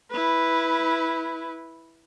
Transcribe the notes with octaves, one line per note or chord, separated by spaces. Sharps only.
E4 B4